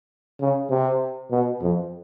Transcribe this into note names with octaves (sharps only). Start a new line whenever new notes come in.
C#3
C3
B2
F2